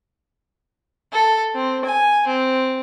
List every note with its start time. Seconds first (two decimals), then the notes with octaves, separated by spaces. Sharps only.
1.13 A4
1.55 C4
1.85 G#5
2.27 C4